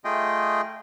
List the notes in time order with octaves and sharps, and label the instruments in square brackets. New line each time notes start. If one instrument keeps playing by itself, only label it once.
[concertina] A3 F4 G#4 D#5 G5